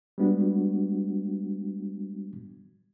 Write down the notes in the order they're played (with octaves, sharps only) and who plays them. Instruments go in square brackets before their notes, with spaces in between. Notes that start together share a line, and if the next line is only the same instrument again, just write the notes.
[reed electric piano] G3 G#3 B3 D4 F#4